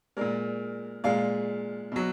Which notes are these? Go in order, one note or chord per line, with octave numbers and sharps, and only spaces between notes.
A#2 G#3 A#4 D5
A#2 G#3 D5 F5
B2 F#3